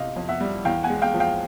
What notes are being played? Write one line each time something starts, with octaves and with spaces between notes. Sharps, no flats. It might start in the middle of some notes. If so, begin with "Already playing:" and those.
Already playing: C3 D#5 F5
F2
E5 F#5
G3
E2 F5 G5
F#5 G#5
G#3
F5 G5
F3
F5 G5